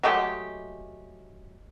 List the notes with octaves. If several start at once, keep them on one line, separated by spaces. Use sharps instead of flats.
F#3 G#3 A3 G4